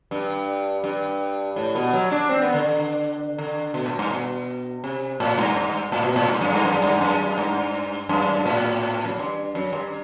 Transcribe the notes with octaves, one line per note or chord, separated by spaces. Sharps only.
G2
G2
A2
B2
F#3
D4
C4
B3
D3
D3
D3
B2
A2
G2
B2
C3
A2
G2
G2
A2
B2
A2
G2
F#2
G2
F#2
G2
F#2
G2
F#2
A2
F#2
G2
F#2
G2